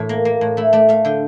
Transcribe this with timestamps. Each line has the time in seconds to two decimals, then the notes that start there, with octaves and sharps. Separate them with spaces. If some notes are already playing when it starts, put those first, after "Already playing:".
Already playing: A2 E3
0.09 A#3
0.25 A#3
0.41 A2
0.57 A3 E4
0.73 A3 D5
0.89 A3 F5
1.05 D3 G5